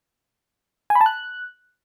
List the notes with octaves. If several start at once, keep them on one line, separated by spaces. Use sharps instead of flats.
G#5
B5
A5
F#6